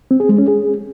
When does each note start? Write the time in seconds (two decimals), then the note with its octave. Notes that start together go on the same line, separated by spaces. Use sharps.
0.11 C4
0.20 G#4
0.29 G#3
0.38 C#4
0.48 G#4